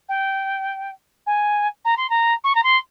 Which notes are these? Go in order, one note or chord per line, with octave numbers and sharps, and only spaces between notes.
G5
G#5
A#5
C6
A#5
C#6
A#5
C6